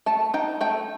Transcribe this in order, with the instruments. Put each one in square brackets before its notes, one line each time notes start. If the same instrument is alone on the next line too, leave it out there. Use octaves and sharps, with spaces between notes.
[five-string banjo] A3 A5
D#4 G5
A3 G5